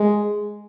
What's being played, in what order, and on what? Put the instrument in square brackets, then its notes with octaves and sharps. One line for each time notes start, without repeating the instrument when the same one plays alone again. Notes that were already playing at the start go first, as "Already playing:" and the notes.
Already playing: [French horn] G#3